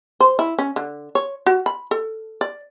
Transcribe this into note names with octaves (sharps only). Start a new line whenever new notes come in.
C5
E4
C#4
D3
C#5
F#4
B5
A4
D5